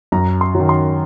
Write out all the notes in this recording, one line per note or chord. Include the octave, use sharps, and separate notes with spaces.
F#2 A#5
C6
F#3
D#3
C6